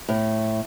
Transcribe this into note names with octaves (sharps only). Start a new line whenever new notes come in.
A2